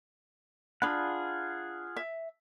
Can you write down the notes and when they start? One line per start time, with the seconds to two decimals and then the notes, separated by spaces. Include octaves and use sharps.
0.82 D4 F4 G#4 F#5 B5
1.96 E5